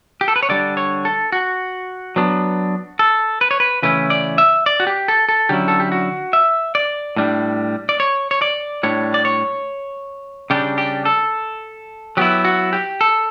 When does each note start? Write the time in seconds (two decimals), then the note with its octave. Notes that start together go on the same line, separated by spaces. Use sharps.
0.21 G4
0.28 A4
0.36 B4
0.43 C#5
0.49 D3 G3 D4 D5
0.77 C#5
1.05 A4
1.32 F#4
2.16 F#3 B3 D4
2.99 A4
3.41 B4
3.51 C#5
3.60 B4
3.82 C#3 E3 A3 C#4 E4 B4
4.10 D5
4.38 E5
4.66 D5
4.80 F#4
4.87 G4
5.08 A4
5.29 A4
5.49 D3 F#3 C#4 E4 G4
5.68 A4
5.80 G4
5.92 F#4
6.33 E5
6.75 D5
7.16 A2 G3 D4
7.89 D5
8.00 C#5
8.31 C#5
8.42 D5
8.83 A2 G3 D4 C#5
9.14 D5
9.25 C#5
10.50 C#3 G3 D4 G4
10.78 G4
11.05 A4
12.17 F#3 B3 E4 G4
12.45 F#4
12.73 G4
13.01 A4